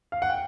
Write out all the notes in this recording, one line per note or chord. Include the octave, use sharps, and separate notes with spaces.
F5
F#5
G5